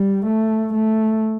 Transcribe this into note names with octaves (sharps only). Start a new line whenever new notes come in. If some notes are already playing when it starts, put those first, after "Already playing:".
Already playing: G3
A3
A3